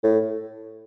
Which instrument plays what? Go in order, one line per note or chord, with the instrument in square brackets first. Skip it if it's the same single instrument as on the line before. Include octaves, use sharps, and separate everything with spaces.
[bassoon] A2